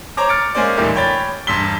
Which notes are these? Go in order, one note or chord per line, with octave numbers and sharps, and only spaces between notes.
C5 C#5 A#5 D6
F6 A6 C#7 D7
G#3 A#3 C#4 C5 D5
A1 D#2 A#2 D#3 G3 A3
C#5 G5 B5 A6
E1 G2 C6 E6 B6 G7